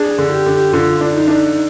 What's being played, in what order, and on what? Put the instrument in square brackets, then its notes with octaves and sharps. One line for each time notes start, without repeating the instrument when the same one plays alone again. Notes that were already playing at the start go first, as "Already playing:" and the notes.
Already playing: [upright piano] D4 [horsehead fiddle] G#4
[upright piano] D3
[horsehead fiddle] G4
[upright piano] D3
[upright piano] D3 [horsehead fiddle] F4
[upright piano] D4
[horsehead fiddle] D#4
[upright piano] D4